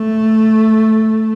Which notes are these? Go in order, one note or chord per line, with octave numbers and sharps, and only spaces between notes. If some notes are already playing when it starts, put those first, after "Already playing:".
Already playing: A3